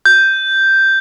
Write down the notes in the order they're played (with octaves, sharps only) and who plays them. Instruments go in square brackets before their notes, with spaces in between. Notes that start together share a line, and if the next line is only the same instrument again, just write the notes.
[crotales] G6